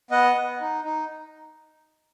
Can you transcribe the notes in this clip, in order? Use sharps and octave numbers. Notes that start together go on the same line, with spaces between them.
B3 D#5 F#5
B3
D#4
D#4